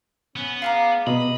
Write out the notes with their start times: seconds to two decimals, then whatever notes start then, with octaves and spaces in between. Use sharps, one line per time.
0.36 B3 C#4
0.62 G#4 D5 F5 A#5
1.07 B2 D#5 B5